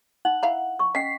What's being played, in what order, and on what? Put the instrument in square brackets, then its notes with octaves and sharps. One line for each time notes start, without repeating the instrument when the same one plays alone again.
[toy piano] D#4 [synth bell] F#5
[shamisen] E4 F5 A#5
[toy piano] C#6
[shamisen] C#4 [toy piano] D#5 G5 [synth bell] B6 C7